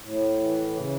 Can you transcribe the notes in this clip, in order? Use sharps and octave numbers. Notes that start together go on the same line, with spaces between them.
A2
E3
C#3